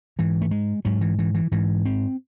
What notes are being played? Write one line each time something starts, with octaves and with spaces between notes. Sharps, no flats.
G#2 E3
A3
G#3
G#2 F#3
E3
E3
E3
G#2 E3
C4